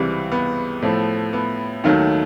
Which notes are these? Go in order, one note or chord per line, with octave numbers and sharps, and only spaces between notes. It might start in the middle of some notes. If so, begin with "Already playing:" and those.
Already playing: C#2 C3 E3 G3
B3
A2 F3 A3
B3
D#2 D#3 F#3 A3